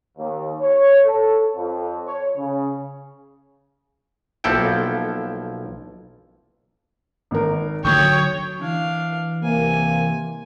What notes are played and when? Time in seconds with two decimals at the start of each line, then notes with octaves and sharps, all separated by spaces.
0.17 D#2
0.60 C#5
1.05 A4
1.55 F2
2.06 C#5
2.36 C#3
4.44 B1 F3 A#3 E4 A4 G5
7.31 G#1 A#4
7.85 D3 D#3 F#3 C#5 G5 C#6 D#6
8.58 E3 D4 F5
9.43 C2 C3 A#3 G#5